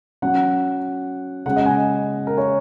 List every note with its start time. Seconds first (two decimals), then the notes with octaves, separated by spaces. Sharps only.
0.22 F#3 C#4 F#5
1.45 C#3 G#3 C#4 F#5
1.56 D#5
1.66 G#5
2.27 A#4
2.37 C#5